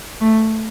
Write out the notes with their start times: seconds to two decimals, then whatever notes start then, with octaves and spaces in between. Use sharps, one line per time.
0.21 A3